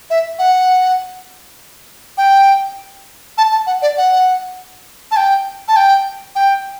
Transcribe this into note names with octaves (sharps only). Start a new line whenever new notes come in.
E5
F#5
G5
A5
A5
F#5
D5
F#5
A5
G5
A5
G5
G5